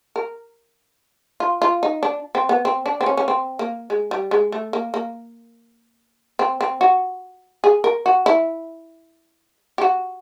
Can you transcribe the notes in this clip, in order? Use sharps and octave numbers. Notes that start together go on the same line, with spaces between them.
A#4
F4
F4
D#4
D4
C4
B3
C4
D4
C4
C#4
C#4
C4
A#3
G#3
G3
G#3
A3
A#3
A#3
C4
C4
F#4
G#4
A#4
F#4
E4
G4
F#4